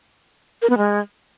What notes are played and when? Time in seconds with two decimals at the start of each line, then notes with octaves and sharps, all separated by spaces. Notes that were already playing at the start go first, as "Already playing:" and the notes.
0.62 A#4
0.70 B3
0.77 G#3